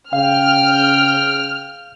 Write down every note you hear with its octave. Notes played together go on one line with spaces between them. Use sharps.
C#3 F5 G5 F6